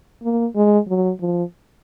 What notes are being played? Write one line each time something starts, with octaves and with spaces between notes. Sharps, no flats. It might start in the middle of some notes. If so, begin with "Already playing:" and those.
A#3
G#3
F#3
F3